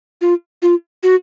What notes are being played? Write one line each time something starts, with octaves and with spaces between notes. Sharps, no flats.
F4
F4
F#4